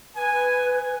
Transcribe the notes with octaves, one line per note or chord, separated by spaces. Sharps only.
B4 G#5